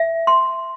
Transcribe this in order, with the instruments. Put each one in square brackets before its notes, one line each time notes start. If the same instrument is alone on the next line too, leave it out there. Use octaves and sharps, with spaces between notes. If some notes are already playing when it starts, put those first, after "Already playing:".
Already playing: [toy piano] E5
C6